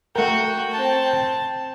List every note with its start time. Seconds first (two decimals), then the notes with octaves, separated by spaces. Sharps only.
0.15 A3 F#4 A#4 F#5 G5
0.71 C4 A5